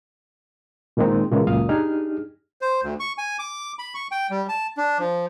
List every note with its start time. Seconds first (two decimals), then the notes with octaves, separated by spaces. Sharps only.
0.97 A#2 D#3 G#3 A#3 C4 D#4
1.31 A#2 C#3 E3 G#3 A#3
1.47 C#2 F#2 A#2 F5 D#6
1.69 D4 D#4 G4 G#4 F6
2.61 C5
2.83 D2
3.00 C#6
3.18 G#5
3.39 D6
3.79 B5
3.94 C#6
4.11 G5
4.30 G3
4.49 A5
4.77 D4
4.99 F3